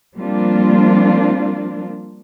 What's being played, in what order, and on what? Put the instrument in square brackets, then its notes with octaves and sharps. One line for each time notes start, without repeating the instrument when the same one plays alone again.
[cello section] F3 G3 A#3 C4 D4 F4